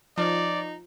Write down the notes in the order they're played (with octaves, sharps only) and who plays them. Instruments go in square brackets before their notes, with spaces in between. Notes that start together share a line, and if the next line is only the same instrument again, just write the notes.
[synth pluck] F3 [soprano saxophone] D#4 [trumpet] D5